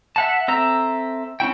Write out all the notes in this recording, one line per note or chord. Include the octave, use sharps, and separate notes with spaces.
E5 F#5 A5
C4 A4 E5 A#5
C4 C#4 E4 G5